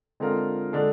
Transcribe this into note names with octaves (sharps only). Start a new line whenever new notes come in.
D3 G#3 C4 F4 A#4
D3 G#3 D4